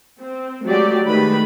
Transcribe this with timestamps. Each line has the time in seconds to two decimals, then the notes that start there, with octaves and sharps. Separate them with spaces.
0.19 C4
0.65 F#3 G#3 A3 G4 D5
1.07 D#3 A3 B4 B5